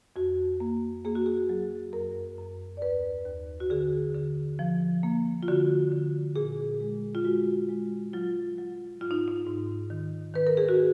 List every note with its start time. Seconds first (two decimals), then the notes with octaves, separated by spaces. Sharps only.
0.16 F2 F#4
0.60 A#3
1.05 A#3 G#4
1.15 F#4
1.26 G#4
1.49 F#3
1.93 F#2 A#4
2.38 F#2
2.77 D5
2.82 D#2 B4
3.26 D#2
3.60 F#4
3.70 D3 G#4
4.14 D3
4.59 F3
5.03 A#3
5.43 F4
5.48 D3 F#4
5.92 D3
6.36 A#2 G#4
6.81 G#3
7.15 F4
7.25 G#3 F#4
7.69 G#3
8.13 F#3 F4
8.58 F#3
9.01 G#2 F4
9.11 D#4
9.28 D#4
9.46 G#2
9.90 D#3
10.34 D#3 B4
10.47 A#4
10.57 G#4
10.69 F#4